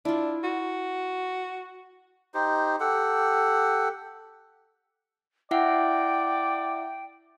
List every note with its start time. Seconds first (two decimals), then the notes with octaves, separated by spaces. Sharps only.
0.05 D4 E4 F4
0.44 F#4
2.34 D#4 G4 C5
2.80 G4 A4 F#5
5.51 E4 D5 E5 F#5 G5